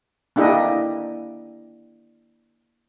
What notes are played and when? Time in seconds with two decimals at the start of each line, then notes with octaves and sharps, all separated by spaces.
0.36 A#3 D4 E4 G4 D#5